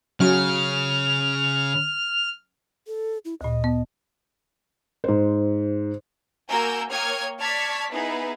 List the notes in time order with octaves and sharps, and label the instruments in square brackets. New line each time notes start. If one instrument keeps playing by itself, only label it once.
[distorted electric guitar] C#3 [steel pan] F#3 C#4 [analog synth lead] F6
[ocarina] A4
E4
[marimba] D2 A#2 [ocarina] D#5
[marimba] B3
[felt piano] G#2 C5
[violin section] A#3 F#4 A#4 G#5 E6 G6
A#3 C#5 G5 D#6 F6 G#6
D5 A5 C#6 F6 G#6 B6
B3 D#4 E4 G#4 B4